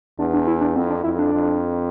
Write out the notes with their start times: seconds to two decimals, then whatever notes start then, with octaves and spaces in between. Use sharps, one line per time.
0.19 E2 D4
0.34 D4
0.47 E4
0.61 D4
0.76 F2 C4
0.90 D4
1.04 F2 E4
1.19 D4
1.33 F2